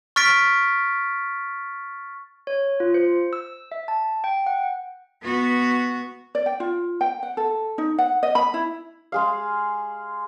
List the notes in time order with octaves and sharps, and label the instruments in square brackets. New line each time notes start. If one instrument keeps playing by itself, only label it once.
[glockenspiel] C#6 F6 A6 B6 D7
[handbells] C#5
F4
C5
E6
E5
A5
G5
F#5
[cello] B3 F#4
[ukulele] D5
G5
F4
G5
F#5
A4
D#4
F#5
D#5
B5
E4
[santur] G#3 G#4 F5